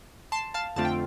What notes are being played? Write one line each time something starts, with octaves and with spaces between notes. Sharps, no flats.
A5 C6
F5 A5
F2 D3 A3 C4 F4 A5
G5